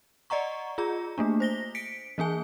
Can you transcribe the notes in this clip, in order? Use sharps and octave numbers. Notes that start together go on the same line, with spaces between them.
D5 D#5 F#5 A#5 C#6
F4 G#4 A#5
A3 A#3 D4
C5 A#6 G7
B6 C#7 D7
E3 A#3 G#4 G#5